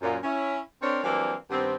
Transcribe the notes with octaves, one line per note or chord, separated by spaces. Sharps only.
F#2 A#2
C#4 E4
C4 D4 A#4 C5 C#5
E3 F#3 G3 A#3 C4 D4
G2 D#3 B3 C4